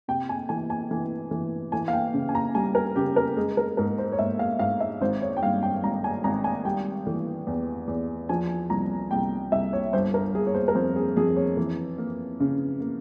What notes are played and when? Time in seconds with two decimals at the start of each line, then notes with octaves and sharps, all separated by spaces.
0.08 C3 G5
0.29 G#5
0.49 E3 G#5
0.70 G#5
0.91 E3
1.31 E3
1.72 E3 G#5
1.88 F5
1.93 G5
2.14 C#3
2.29 G#5
2.35 A#5
2.55 G3 G#5
2.75 A#4
2.96 C#3 G4
3.16 A#4
3.37 G#3 G#4
3.57 A#4
3.77 G#2 A#4
3.98 C5
4.12 C#5
4.19 G#2 E5
4.39 F5
4.59 G#2 F5
4.80 E5
5.01 G#1 C5
5.22 C#5
5.37 G5
5.42 G2 F5
5.63 G5
5.83 G#1 A#5
6.04 G#5
6.24 G#1 A#5
6.44 G#5
6.65 G3 G5
7.07 E3
7.47 E2
7.88 E2
8.29 F3 G#5
8.70 C2 A#5
9.11 C2 G5
9.52 C2 E5
9.73 C#5
9.93 G1 C5
10.14 A#4
10.34 G1 G#4
10.47 C#5
10.54 C5
10.68 A#4
10.75 F2 C5
10.96 G#4
11.17 F2 G#4
11.36 C#5
11.57 E3
11.98 A#3
12.40 C#3
12.80 A#3